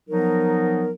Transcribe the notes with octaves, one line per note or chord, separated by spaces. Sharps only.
F3 F#3 B3 D#4 A#4